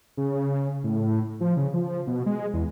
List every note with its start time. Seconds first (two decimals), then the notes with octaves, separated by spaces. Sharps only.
0.17 C#3
0.84 A2
1.41 F3
1.57 C#3
1.74 F3
2.07 B2
2.26 G#3
2.54 E2